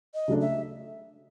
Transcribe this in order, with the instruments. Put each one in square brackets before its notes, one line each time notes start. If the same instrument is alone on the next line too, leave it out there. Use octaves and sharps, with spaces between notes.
[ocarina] D#5
[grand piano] C#3 F#3 A3 D4
[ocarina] E5